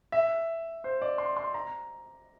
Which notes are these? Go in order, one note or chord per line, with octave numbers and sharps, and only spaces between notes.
E5
C5
D5
C6
C6
A#5